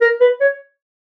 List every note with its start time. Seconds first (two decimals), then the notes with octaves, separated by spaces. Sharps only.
0.01 A#4
0.21 B4
0.41 C#5